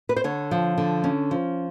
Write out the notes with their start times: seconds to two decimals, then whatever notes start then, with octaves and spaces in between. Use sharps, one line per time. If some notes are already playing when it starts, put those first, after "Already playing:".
0.09 B4
0.17 C5
0.24 D3 C#5
0.51 F3
0.78 D3
1.04 C#4
1.31 F3